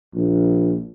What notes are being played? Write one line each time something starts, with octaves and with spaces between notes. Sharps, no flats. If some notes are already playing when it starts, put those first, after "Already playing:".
A#1